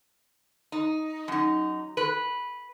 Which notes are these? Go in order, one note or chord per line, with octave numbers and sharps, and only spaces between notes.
D#4
F#2 D#4
B4